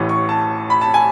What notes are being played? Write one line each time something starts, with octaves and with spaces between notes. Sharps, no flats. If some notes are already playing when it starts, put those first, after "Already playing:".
Already playing: A1 A2 E3
C#6
A5
B5
A5
G#5